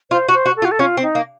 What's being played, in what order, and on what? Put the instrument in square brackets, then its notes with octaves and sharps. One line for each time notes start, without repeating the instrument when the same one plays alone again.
[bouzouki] F4 [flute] C5
[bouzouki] F#4
[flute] C5
[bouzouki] F#4
[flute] A4
[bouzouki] F4
[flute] F#4
A4
[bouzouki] C#4 [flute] F4
[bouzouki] C4
[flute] D#4
[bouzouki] A#3